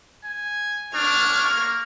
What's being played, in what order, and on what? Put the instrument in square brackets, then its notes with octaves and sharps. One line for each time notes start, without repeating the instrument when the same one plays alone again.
[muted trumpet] G#5
[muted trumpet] D4 [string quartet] C#6 F6 G#6
[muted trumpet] A#3